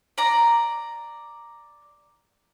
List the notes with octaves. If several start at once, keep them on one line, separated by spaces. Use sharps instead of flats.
D5 A#5